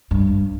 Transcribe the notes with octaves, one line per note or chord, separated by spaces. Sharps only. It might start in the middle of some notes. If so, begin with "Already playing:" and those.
G2